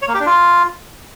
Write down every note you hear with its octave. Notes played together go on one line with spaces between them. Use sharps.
C#5
A#3
G4
D4
F4